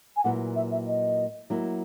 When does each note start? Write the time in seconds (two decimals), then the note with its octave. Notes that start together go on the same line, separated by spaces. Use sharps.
0.17 G#5
0.24 A#2 F#3 A#3 E4 B4 F#5
0.56 E5
0.72 E5
0.87 D#5
1.50 F#3 A#3 E4